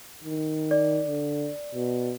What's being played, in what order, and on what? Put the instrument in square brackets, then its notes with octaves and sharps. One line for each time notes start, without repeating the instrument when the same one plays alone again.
[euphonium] D#3
[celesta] D5
[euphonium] D3
B2